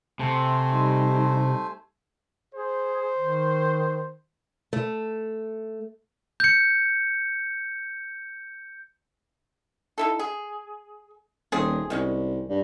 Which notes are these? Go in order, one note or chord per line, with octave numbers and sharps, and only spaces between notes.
C3 A3 C5 G#5
G3 D#4
G#4 C5
D#3
A3
G6 C#7
D#4 E4 A4
G#4
D#1 A3 C4 G#4
C2 D#3 G#3 C#4
G2